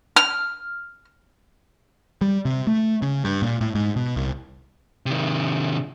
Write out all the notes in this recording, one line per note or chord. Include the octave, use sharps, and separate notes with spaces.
F6
G3
C3
A3
C#3
G2
A#2
A2
G#2
B2
C2
C3 D#3